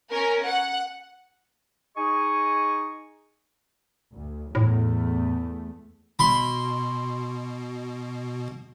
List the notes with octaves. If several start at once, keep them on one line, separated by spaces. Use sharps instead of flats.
C#4 A#4
F#5
D#4 G#4 D#5 G#5 C#6
D2
E2 A2 A3
B2 B5 C6